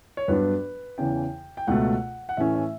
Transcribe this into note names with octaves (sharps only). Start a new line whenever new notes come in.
C#5
G2 F#3 B3 D4 B4
E2 C#3 E3 G5
G5
C#2 B2 A3 F#5
F#5
A2 E3 A3 C#4 E5
E5